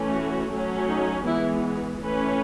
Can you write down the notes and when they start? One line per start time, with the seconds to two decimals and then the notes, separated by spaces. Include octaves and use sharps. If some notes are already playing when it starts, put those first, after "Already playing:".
Already playing: E3 A3 C#4
0.13 F#4
0.51 F#3 A3 C#4
0.89 D#4
1.25 E3 G#3 B3 E4
2.01 E3 A3 C#4 B4